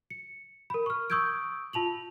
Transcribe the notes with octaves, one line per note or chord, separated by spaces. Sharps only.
C#7
A#4 B5
C#6 F6
C#6 D#6 E6 G6 G#6 D7
F4 A5 F7 F#7